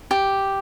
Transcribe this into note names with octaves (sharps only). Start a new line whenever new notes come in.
G4